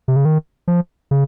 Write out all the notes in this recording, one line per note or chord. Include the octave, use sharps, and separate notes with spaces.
C3
C#3
D#3
F3
C#3